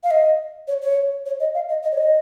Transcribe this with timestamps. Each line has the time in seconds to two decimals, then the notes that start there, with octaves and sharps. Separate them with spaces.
0.04 F5
0.11 D#5
0.68 C#5
0.82 C#5
1.26 C#5
1.40 D#5
1.54 F5
1.69 D#5
1.83 D#5
1.92 C#5
1.98 D#5